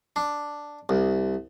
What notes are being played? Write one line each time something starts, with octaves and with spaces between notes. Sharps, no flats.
D4
C2